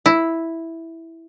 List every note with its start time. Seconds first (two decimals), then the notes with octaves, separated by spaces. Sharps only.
0.06 E4